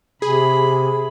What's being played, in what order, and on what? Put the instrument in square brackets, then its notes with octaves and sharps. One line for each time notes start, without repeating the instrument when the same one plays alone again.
[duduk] C3 [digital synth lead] G#4 [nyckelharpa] B5